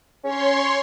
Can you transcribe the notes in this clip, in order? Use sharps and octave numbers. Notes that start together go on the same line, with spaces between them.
C#4 C#5 C6